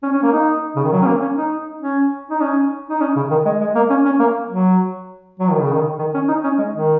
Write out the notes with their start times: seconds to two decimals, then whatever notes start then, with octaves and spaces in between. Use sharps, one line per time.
0.03 C#4
0.13 C#4
0.23 A#3
0.33 D#4
0.76 C#3
0.84 D#3
0.93 F#3
1.02 C#4
1.07 A#3
1.22 C#4
1.37 D#4
1.82 C#4
2.30 D#4
2.41 C#4
2.90 D#4
3.01 C#4
3.16 C#3
3.31 D#3
3.46 G#3
3.61 G#3
3.75 A#3
3.90 C#4
4.05 C#4
4.20 A#3
4.49 F#3
5.40 F#3
5.51 D#3
5.61 C#3
5.72 D#3
5.99 D#3
6.14 C#4
6.28 D#4
6.44 C#4
6.58 G#3
6.74 D#3